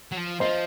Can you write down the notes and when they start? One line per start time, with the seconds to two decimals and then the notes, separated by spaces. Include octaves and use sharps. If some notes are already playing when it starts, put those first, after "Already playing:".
0.12 F#3
0.17 F3
0.40 F3 C5 D#5